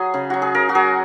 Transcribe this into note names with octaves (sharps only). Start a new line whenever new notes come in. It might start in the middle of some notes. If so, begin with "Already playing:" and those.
Already playing: F#3 G#4
C#3
F#3 F#4
G#4
C#3 A#4
F#4
F#3 G#4